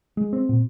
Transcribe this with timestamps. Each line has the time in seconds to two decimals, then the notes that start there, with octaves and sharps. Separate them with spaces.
0.17 G#3
0.33 C4
0.49 A#2